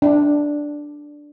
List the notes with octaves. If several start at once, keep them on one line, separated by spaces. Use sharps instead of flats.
D4